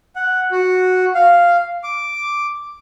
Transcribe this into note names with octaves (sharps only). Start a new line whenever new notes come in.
F#5
F#4
F5
D6